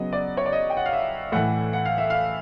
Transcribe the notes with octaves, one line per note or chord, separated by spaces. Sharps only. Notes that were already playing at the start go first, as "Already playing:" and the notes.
Already playing: C#3 F#3 B3 D#5
D5
C#5
D5
D#5
G5
F#5
F5
E5
A2 E3 A3 F#5
F#5
F5
E5
F5